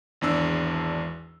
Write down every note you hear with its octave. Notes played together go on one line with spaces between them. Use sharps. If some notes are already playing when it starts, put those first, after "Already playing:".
G#1 E2 D4 E6